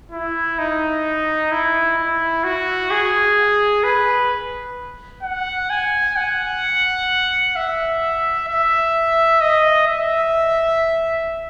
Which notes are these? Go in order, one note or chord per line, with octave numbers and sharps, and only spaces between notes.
E4
D#4
E4
E4
F#4
G#4
B4
F#5
G#5
F#5
E5
E5
D#5
E5